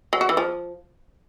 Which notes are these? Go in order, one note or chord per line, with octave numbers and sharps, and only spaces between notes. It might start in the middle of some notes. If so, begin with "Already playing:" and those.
F#3
F#4
E3
F3